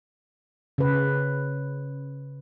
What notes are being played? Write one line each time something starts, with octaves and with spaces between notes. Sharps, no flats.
C#3 B4